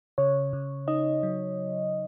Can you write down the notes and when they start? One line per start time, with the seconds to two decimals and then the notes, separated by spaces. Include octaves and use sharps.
0.18 C#3 C#5
0.53 C#3
0.88 D#4 D#5
1.23 F#3